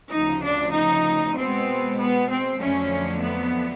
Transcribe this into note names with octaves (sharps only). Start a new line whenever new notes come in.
D2 C#3 F3 D#4
D4
D#4
B2 G#3 B3 C4
B3
C4
F2 D3 F#3 A3 C#4
B3